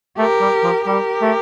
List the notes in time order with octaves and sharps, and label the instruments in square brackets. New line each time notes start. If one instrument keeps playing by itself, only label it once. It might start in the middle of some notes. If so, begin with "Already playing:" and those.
[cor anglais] A3 [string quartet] G4 A#4
[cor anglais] G3
F3
[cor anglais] G3 [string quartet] G4 A#4
[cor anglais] A3